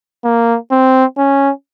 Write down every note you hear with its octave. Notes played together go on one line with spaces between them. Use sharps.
A#3
C4
C#4